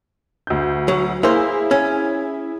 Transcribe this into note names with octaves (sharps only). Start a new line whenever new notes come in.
D2 G6
F#3
A#3 E4 G#4 C5 E6
C#4